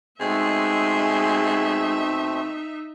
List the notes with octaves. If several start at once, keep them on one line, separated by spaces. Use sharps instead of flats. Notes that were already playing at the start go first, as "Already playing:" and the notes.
B2 G#3 A3 C4 D#4 E5